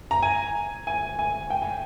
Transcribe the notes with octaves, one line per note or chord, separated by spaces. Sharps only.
A#5
G#5
G#5
G#5
G5
G#5